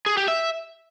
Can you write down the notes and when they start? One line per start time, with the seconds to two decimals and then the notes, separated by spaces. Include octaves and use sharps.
0.06 G#4
0.17 G4
0.28 E5